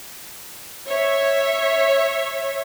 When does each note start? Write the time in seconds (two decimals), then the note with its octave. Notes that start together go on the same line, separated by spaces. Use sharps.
0.89 C#5 E5